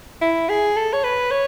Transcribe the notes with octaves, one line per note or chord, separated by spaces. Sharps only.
E4
G#4
A4
C#5
B4
C#5